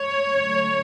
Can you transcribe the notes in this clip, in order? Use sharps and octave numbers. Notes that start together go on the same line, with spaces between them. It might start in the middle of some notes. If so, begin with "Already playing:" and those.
Already playing: C#5
D3 F#3 A3